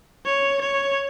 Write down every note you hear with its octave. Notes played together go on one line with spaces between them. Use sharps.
C#5
C#5